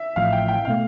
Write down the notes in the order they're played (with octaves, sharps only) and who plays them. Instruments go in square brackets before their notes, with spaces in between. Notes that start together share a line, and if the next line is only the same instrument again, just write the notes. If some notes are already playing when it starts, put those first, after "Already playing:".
Already playing: [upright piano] E5
[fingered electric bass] A1 A2 F3 [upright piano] F5
[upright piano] G5
G5
[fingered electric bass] B2 A3 [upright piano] F5